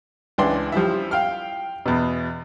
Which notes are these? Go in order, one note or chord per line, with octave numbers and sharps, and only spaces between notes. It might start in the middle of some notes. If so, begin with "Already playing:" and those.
C#2 E3 D4 C6
F3 G3 E4 E5
F5 G5 F6
E2 B2